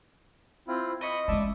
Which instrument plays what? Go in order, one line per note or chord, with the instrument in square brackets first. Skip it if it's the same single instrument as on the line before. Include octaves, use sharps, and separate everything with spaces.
[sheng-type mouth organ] C4 E4 F4
[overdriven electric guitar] D#5 [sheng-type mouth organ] B5 C#6
[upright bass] G#3 C#4 [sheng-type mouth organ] D5 E5 A5